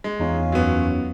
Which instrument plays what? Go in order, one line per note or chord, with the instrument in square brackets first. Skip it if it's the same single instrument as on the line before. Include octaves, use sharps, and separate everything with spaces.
[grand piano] G#3
[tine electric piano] E2 D#4 [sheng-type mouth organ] C#4 F4
[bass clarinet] F#2 [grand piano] F#3 B3